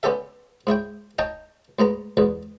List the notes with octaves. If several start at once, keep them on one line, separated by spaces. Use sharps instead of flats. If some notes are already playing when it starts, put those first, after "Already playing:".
D3 B3 C#4 G4 A4 E5
G#2 E4 C#5 G5
D#4 C#5 D#5 G5 A5
D2 G#2 B3 A#5
E2 G#2 B2 D3